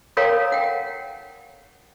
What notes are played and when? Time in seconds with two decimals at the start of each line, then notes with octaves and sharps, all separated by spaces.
0.17 A4 A#4 C#5 F5 G5 A#5
0.52 F#5 G5